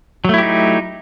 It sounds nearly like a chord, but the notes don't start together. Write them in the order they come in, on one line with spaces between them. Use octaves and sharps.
F#3 A3 E4 G4 D#4